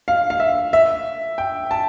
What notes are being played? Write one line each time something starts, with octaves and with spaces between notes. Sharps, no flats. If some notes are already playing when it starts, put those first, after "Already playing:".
F5
F5
E5
E5
G5
A5